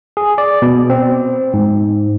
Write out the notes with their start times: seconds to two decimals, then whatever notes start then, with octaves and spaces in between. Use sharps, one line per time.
0.17 G#4
0.38 D5
0.62 B2
0.90 C4
1.54 G#2